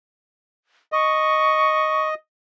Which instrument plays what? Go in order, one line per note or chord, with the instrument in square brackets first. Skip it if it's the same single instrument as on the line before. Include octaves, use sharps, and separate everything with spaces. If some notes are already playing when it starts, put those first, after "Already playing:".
[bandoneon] D#5 [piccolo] C#6